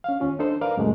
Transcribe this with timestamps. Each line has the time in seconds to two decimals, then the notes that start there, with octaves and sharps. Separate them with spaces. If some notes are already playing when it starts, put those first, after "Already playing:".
0.04 C#4 F5
0.20 D#2 C#4 F4
0.39 D4 D#4 A4 C5
0.61 A#4 B4 D5 F5 A#5
0.77 C2 F#2 A#2 C#3 G#3 A3